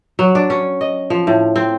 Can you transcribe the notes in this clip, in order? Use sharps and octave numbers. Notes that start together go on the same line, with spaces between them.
F#3
D4
C#4
D#5
F3
A2
C4